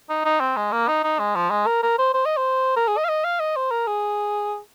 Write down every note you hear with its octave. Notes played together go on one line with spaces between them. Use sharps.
D#4
D#4
C4
G#3
A#3
D#4
D#4
G#3
F3
G#3
A#4
A#4
C5
C5
D#5
C5
A#4
G#4
D#5
F5
D#5
F5
D#5
C5
A#4
G#4